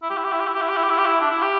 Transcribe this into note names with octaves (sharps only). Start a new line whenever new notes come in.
E4
G4
E4
G4
E4
G4
E4
G4
E4
G4
E4
G4
E4
G4
E4
D4
E4
G4